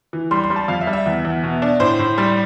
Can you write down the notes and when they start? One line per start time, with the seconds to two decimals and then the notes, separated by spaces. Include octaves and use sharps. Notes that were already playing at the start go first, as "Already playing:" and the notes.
0.13 E3
0.31 G3 C6
0.44 C6
0.50 G3
0.56 A5
0.68 F2 F5
0.81 E5
0.87 G3
0.93 E5
1.06 E2
1.25 E2
1.43 B2
1.62 D4
1.80 A2 C5
1.99 A2
2.18 G3